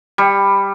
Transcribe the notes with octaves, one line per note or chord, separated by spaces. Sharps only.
G3